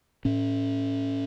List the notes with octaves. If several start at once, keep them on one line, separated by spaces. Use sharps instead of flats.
A2 C#4